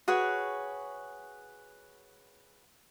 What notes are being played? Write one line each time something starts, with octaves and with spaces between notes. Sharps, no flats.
F#4 G#4 B4 C#5